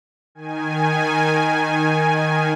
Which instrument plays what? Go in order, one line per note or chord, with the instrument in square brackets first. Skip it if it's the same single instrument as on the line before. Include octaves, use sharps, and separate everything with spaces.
[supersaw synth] D#3 G#5